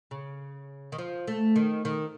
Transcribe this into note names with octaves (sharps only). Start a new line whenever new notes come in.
C#3
D#3
F3
A3
D#3
D#3